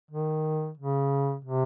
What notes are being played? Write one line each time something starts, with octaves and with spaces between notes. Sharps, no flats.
D#3
C#3
C3